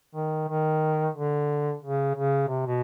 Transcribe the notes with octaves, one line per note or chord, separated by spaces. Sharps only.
D#3
D#3
D3
C#3
C#3
C3
B2